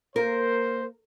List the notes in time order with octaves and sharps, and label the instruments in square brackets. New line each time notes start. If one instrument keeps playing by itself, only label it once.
[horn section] A#3 C5 [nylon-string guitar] A#4